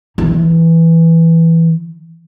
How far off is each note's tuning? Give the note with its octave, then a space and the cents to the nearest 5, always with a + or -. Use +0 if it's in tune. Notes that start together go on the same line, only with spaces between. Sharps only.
E3 +0 E4 -40